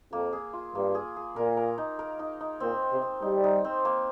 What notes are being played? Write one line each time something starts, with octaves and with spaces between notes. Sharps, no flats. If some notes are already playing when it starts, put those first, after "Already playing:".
F2 A#3
G#4
F4
G2 A#3
G#4
G#4
A#2 A#4
A#4
D#4
A#4
D#4
D#4
A#2 C4
C4
C3
C4
G3 D#4
D#4
C4
A#3